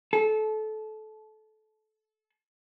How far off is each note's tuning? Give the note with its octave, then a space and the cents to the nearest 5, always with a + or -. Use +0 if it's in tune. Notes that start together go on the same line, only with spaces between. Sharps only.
A4 -25